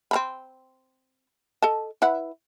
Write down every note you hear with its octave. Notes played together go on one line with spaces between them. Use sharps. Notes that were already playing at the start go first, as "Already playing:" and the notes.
C4 A#5 B5
A4 D#5 A5
E4 B4 F#5